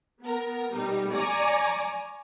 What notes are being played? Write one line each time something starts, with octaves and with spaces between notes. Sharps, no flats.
B3 A#4
B2 G3 D#4
D5 G#5 A#5 C#6 D6